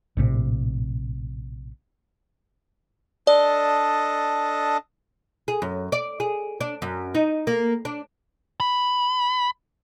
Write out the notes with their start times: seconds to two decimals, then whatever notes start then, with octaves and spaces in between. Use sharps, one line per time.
0.17 A#1 A2 C3
3.27 D4 A4 D5 D#5
5.48 G#4
5.62 F#2
5.92 D5
6.20 G#4
6.61 D4
6.82 F#2
7.15 D#4
7.47 A#3
7.85 D4
8.60 B5